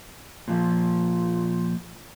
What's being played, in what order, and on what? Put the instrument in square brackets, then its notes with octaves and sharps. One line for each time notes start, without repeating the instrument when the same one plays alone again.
[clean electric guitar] A#2 F3